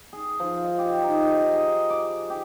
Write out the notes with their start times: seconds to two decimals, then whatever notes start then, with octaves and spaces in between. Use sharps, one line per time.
0.13 G#4
0.40 F3
0.64 D#5
0.78 G4
1.03 D#4
1.53 G#4
1.90 D6
2.30 G4